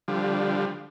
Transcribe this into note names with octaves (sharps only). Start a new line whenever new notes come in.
D3 F3 G3